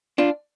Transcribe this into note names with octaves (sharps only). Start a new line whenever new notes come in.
D4 F4